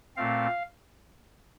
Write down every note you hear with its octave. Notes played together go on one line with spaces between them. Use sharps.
A#2 A3 C4 F5